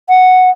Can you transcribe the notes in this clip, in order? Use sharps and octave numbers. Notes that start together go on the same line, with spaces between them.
F#5